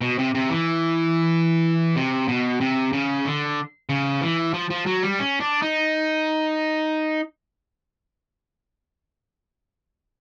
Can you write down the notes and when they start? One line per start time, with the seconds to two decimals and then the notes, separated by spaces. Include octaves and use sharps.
0.01 B2
0.18 C3
0.35 C3
0.50 E3
1.96 C3
2.28 B2
2.61 C3
2.93 C#3
3.25 D3
3.89 C#3
4.21 E3
4.54 F3
4.70 F3
4.86 F#3
5.03 G3
5.19 C#4
5.40 D4
5.62 D#4